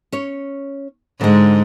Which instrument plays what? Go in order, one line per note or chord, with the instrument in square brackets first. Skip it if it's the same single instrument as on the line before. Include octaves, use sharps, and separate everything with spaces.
[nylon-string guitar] C#4 C#5
[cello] G#2 [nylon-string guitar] D3 G#3